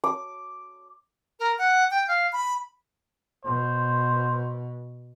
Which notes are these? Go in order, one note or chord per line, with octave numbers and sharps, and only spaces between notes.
D6
A#4
F#5
G5
F5
B5
B2 C5